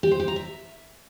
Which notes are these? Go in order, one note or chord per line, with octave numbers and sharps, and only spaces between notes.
G4
C5
G4
A#5
E5